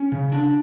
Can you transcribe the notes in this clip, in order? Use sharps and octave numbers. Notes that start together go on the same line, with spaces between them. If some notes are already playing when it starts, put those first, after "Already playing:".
Already playing: C#4
C#3
D4